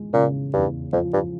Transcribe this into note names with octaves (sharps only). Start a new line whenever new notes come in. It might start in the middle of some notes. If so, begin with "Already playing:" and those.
Already playing: G#3
A#2 C#3
E2 G2
F2 F3
G2